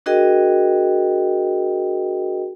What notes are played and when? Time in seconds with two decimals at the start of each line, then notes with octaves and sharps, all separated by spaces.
0.06 D4 F#4 G#4 A#4 D#5 G5